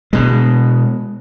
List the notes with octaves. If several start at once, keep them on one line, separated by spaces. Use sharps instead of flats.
B2 G#3